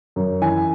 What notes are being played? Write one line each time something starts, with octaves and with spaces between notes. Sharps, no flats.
F#2
E3 G#5